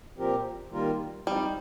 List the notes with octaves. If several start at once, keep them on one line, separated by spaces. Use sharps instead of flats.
A#2 F3 C4 G4 A#4
D#3 G3 A#3 F4 A#4
F3 G3 C4 D#4